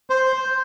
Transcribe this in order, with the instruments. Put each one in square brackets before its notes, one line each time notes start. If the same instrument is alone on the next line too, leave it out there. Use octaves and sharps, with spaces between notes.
[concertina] C5